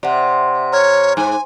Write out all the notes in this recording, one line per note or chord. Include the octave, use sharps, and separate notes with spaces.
C3 D5 E5 F#5
C#5 A#5 F6 G#6
G#2 G#5